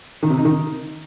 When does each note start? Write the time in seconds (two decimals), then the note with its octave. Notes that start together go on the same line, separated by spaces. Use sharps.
0.23 D#3
0.30 C3
0.37 D#4
0.45 D#3